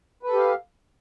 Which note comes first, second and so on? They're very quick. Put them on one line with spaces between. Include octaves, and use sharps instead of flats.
B4 A4 G4 F5